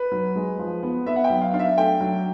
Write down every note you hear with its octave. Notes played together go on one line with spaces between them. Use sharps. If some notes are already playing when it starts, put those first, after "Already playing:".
Already playing: B4
F#3
G#3
F3
B3
B3 E5
F#5
G5
F#3
F5
D4 F5
E5
A3 G5
F#3